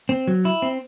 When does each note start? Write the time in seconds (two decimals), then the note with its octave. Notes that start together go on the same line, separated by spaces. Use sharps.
0.09 C4
0.27 F#3
0.45 E4
0.62 C4